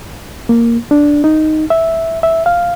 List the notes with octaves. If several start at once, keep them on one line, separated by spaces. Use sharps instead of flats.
A#3
D4
D#4
E5
E5
F5